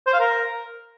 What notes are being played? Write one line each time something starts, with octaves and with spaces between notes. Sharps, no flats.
C5
F5
A#4